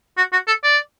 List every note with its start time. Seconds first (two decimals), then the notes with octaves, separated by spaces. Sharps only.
0.17 F#4
0.32 F#4
0.47 A4
0.64 D5